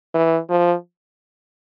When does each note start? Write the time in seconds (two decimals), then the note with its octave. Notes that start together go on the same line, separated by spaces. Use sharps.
0.14 E3
0.50 F3